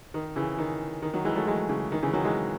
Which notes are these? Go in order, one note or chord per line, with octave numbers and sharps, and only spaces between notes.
D#3
C#3 E3
D#3
D#3
D#3 F#3
E3 G#3
F#3 A3
E3 G#3
C#3 E3
D#3
C#3 E3
D#3 F#3
E3 G#3